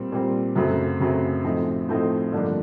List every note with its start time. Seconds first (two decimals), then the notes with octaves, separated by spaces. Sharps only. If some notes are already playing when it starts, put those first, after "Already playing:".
Already playing: A#2 G3 C4
0.12 A#2 G3 C4
0.56 F#2 C#3 F#3 A3 C4
1.00 F#2 C#3 F#3 A3 C4
1.44 A2 F3 A3 C4 D#4
1.89 A2 F3 A3 C4 D#4
2.32 G2 D3 F3 A#3 D4